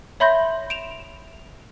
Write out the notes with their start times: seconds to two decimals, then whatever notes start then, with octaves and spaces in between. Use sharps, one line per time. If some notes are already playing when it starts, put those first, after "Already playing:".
0.20 C#5 E5 B5 C6 G6 A#6
0.70 D7 E7 F7